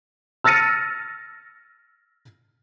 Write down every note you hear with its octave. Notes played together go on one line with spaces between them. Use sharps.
E6 F6 A6 A#6 C#7 D#7